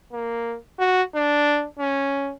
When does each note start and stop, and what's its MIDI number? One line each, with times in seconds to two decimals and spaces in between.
0.12 0.56 58
0.79 1.02 66
1.15 1.66 62
1.79 2.32 61